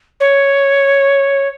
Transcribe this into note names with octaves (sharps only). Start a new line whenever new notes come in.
C#5